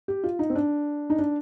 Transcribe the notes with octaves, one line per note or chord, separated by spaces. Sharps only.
G4
F4
D#4
C4
D4
D#4
D4